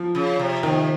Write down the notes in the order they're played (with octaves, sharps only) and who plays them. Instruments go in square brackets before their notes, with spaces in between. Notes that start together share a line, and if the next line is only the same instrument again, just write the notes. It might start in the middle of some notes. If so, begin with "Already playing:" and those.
Already playing: [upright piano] F3
[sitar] C#3
C3
[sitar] C3 [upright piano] D#3